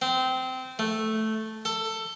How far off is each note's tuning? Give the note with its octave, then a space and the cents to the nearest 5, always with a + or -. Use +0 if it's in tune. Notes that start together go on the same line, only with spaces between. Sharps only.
C4 -20
A3 -5
A4 +15